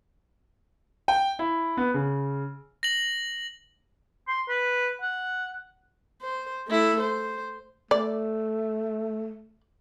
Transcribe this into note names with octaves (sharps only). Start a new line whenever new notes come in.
G5
E4
B3
C#3
A#6 F#7
C6
B4
F#5
C5
A3 E4
C5
A3 D5